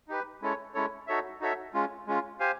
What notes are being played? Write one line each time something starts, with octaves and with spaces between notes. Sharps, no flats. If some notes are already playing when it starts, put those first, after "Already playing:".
D#4 G4 B4
G#3 C#4 E4 A4 C#5
G#3 C#4 E4 A4 C#5
D#4 F#4 A4 C#5 E5
D#4 F#4 A4 C#5 E5
G#3 C#4 F4
G#3 C#4 F4
G4 C5 F5 G#5